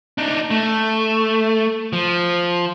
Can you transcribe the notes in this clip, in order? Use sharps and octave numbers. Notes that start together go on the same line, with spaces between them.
D4 D#4
A3
F3